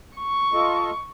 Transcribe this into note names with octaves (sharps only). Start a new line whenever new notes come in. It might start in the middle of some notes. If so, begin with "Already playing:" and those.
C#6
F4 A4 D#5